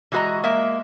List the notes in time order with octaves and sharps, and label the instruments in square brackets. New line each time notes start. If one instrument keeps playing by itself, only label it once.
[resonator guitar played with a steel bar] E3 G#3 F#4 B4 D#5 A#5
G#3 A#3 E5